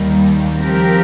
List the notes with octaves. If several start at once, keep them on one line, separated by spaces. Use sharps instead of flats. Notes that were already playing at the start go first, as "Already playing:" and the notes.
Already playing: D#2 D#3 G3
F3 C4 G4 A#4